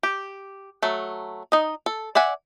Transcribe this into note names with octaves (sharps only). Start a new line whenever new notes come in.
G4
F#3 A3
D#4 D#5
A4
D5 E5 F#5 G#5